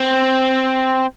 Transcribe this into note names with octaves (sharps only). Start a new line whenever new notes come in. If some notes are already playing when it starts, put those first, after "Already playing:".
Already playing: C4